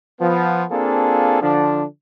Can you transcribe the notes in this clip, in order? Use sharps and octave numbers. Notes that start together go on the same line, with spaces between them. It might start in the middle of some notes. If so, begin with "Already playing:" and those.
F3 B3
A#3 C4 D4 F4 G#4 A4
D3 F3 D4